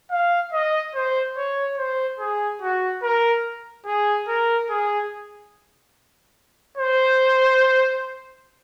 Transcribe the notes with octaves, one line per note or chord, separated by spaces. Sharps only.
F5
D#5
C5
C#5
C5
G#4
F#4
A#4
G#4
A#4
G#4
C5